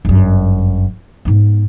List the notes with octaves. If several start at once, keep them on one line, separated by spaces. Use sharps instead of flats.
G1 F#2
G#2 B3